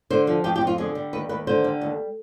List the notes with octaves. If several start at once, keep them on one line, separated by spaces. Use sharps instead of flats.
D3 C5
F3
F2 G4
G4
F2
F4
D3 G#4
G3
D#2 B4
D#2 B4
D3 C5
G3
D#2